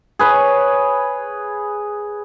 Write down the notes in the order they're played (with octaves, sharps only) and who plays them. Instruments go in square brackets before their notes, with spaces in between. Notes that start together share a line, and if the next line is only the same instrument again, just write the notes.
[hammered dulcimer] G#4 B4 C#5